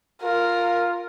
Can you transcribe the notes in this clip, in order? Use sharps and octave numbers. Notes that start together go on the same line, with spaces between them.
F4 A#4